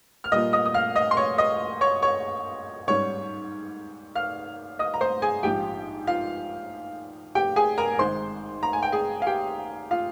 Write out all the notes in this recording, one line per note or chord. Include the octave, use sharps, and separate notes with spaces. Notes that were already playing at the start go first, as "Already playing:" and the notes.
F6
A#2 G3 A#3 F4 D#5 D#6
D#5 D#6
D#6
F5 F6
D#5 D#6
C6
C#5 C#6
D#5 D#6
C#5 C#6
C#5 C#6
G#2 G3 C#4 C#5 C#6
F5 F6
D#5 D#6
A#5
C5 C6
G#4 G#5
A#1 G#2 F3 G4 G5
F4 F5
G4 G5
G#4 G#5
A#4 A#5
G#1 G#2 D#3 G#3 C5 C6
A#5
G#5
G5
G#4 G#5
F5
G4 G5
F4 F5